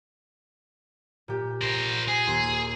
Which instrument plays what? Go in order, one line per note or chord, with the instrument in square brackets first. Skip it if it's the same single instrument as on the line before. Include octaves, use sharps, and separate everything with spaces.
[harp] A#2 G4
[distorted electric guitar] A#4 C5
G#4
[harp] D#2 C6 C7